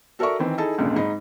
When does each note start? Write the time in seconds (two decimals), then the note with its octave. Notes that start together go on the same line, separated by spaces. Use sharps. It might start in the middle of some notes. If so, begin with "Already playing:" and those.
0.19 F#4 A4 A#4 D5 E5 C#6
0.39 D#3 E3 C4
0.58 D#4 E4 G#4 A4 A5
0.78 G#1 C#2 A#2 D3
0.96 G#2 D#4 B5